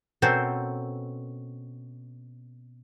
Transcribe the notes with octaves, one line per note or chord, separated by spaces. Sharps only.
B2 C4 C#4 A4 A#4 C5